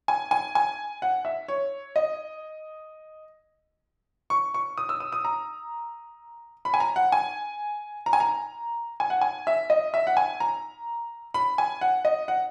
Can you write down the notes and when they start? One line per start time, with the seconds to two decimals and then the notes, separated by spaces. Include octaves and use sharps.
0.08 G#5
0.31 G#5
0.55 G#5
1.02 F#5
1.25 E5
1.48 C#5
1.96 D#5
4.30 C#6
4.54 C#6
4.78 D#6
4.89 E6
5.00 D#6
5.12 D#6
5.25 A#5
6.65 B5
6.74 G#5
6.80 A#5
6.96 F#5
7.12 G#5
8.06 A#5
8.13 G#5
8.20 A#5
9.00 G#5
9.10 F#5
9.21 G#5
9.47 E5
9.70 D#5
9.94 E5
10.07 F#5
10.17 G#5
10.40 A#5
11.34 B5
11.58 G#5
11.81 F#5
12.05 D#5
12.28 F#5